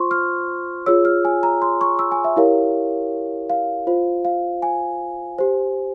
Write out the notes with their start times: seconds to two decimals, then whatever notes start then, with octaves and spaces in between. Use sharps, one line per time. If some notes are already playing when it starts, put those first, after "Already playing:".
Already playing: F4 C5 C6 C#6
0.11 F6
0.86 F4 G#4 C#5 E6
1.05 F6
1.25 G#5
1.43 A#5
1.62 C6
1.81 C#6
1.99 E6
2.12 G#5
2.24 E5
2.36 E4 G4 A#4 C#5 F5
3.50 F5
3.87 F4 C5
4.25 F5
4.62 G#5
5.38 G4 C5